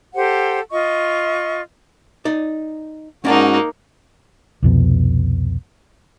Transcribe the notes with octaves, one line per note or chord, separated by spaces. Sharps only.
G4 A4 C5 F#5
F4 D#5 C#6
D#4 D5
G#2 A#3 C#4 D#4 F#4 D5 A5
C2 F2 B2